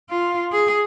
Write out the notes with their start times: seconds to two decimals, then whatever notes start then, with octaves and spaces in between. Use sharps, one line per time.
0.10 F4
0.52 G#4